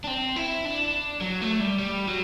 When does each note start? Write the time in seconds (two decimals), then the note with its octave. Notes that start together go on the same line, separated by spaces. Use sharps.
0.04 D4
0.07 C4
0.36 E4
0.65 D4
1.21 F#3
1.42 A3
1.60 G3
1.79 G3
2.08 F#3